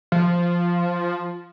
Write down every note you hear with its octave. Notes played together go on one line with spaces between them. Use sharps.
F3